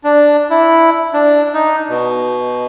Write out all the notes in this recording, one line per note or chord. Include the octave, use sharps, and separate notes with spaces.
D4
E4
D4
D#4
B2